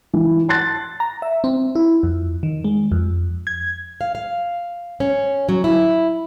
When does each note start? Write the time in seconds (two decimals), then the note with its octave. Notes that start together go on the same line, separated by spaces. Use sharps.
0.13 E3
0.49 A5 C6 F#6 A6
1.00 A#5
1.22 E5
1.44 C4
1.75 E4
2.03 F2
2.43 D#3
2.64 G#3
2.92 F2
3.47 G#6
4.01 F5
4.15 F5
5.00 C#4
5.49 F#3
5.64 E4